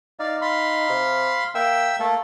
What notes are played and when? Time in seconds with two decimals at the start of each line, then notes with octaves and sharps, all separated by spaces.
0.19 D#4 D5 F5
0.42 F5 B5 C6
0.89 C3
1.55 A#3 E5 G5 E6
2.00 A3 A#3 A4